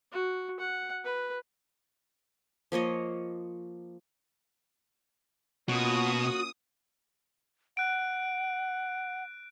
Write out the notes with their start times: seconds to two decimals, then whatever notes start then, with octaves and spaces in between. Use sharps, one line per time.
0.12 F#4
0.60 F#5
1.04 B4
2.72 F3 A#3 C#5 D#5
5.69 B2 A#3 C#4 F4 F#4 D#6
7.77 F#5 F#6 D7